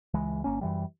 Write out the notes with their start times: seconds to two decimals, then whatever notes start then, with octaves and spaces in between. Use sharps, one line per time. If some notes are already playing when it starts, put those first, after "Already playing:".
0.14 C#2 E3 G#3
0.44 G1 A#3 C#4
0.61 F#2 E3 G3